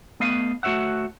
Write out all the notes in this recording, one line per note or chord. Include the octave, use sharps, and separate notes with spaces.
A3 B3 D#5 F5
A3 F#4 C#5 E5 F#5